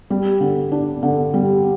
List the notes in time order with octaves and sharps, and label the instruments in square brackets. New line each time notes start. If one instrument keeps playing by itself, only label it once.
[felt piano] G3
D3
D4
D3
G3